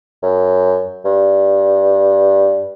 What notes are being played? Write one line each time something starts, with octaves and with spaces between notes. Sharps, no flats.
F#2
G2